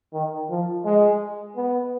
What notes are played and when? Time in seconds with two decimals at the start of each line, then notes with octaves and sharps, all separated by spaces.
0.13 D#3
0.49 F3
0.85 G#3
1.56 B3